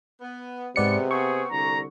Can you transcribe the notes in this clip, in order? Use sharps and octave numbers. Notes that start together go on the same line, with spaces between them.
B3
G#2 C3 G#3 B3 D5 C#7
B3 C4 G#4 C#6
C2 D3 A#5